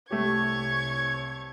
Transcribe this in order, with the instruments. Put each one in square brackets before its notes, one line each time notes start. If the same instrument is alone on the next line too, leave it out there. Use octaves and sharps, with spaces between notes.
[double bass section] C2 [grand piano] A3 G4 [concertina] C#5 [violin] C#6 G#6